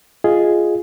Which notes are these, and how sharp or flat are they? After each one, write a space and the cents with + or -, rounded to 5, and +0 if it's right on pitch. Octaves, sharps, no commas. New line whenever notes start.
F4 +0 G#4 +0 D#5 +0